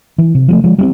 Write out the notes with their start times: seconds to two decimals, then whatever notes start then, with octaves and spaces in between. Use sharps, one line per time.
0.18 E3
0.35 C3
0.48 F3 G3 A3
0.64 F3 G#3
0.79 G3 A#3 C4